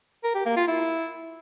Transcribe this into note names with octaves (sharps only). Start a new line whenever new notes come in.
A#4
G4
A#3
F4
E4